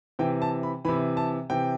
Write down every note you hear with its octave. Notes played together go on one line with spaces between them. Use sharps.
C3 E3 G5
A5
B5
C3 E3 B5
A5
C3 E3 G5